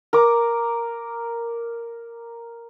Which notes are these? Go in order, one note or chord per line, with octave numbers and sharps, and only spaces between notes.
A#4 A#5 D6